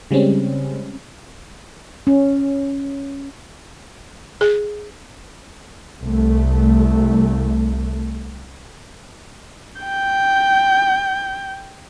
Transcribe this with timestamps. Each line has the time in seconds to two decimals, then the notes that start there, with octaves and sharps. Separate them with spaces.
0.11 C#3 G3 G#3 C4 C#4
2.07 C#4
4.41 G#4
6.02 C2 A3
9.82 G5 G6